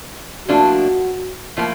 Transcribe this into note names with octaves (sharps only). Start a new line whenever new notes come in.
A2 F3 A#3 D4 F#4
A2 F3 A#3